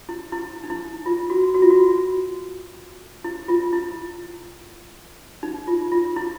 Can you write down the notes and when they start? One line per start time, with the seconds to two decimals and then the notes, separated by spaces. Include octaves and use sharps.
0.09 E4
0.32 E4
0.64 D#4
0.70 E4
1.06 F4
1.30 F#4
1.55 F#4
1.62 F4
1.70 F#4
3.24 E4
3.48 F4
3.73 E4
5.43 D#4
5.68 F4
5.92 F4
6.16 E4